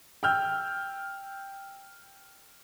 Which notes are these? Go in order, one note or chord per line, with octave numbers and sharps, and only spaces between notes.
G5 E6 F6 G6